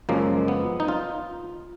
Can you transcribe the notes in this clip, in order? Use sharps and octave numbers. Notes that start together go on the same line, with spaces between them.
F#2 C#3 F3 G#3 A#3
B3
D#4
F4